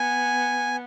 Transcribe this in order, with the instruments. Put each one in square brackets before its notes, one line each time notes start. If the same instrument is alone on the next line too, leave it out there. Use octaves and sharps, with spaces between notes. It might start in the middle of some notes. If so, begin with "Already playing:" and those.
Already playing: [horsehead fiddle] B3 [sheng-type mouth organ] G#5